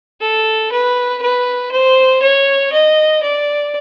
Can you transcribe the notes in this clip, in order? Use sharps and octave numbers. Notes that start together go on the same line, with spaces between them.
A4
B4
B4
C5
C#5
D#5
D5